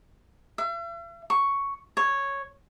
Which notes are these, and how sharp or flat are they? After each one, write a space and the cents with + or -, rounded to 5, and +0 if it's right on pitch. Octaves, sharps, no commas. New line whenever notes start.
E5 +45
C#6 +5
C#5 -5